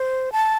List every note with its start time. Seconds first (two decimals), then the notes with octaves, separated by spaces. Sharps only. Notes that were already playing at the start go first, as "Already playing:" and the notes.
Already playing: C5
0.32 A5